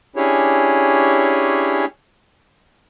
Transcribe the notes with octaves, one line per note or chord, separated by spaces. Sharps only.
C#4 D4 E4 G4 G#4 C#5